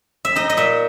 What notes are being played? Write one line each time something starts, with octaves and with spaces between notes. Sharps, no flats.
E5
D#4 D#5
D#5
A#2 E5